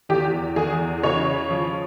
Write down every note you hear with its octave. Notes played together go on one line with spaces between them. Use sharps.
E2 G4
E2 G#4
C#3 C#5
F3